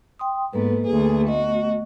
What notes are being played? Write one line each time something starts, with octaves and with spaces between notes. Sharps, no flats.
G5 C6 D#6
G#2 A#3 B3 A4 B4
D2 G#4
A3 B3 F#4 D#5